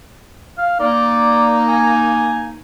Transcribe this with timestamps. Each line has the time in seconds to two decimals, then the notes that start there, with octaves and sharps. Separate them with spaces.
0.58 F5
0.80 A#3 D#4 D5
1.68 G#5